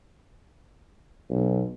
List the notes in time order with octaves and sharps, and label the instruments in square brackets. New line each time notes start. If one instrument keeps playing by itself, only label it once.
[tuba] B1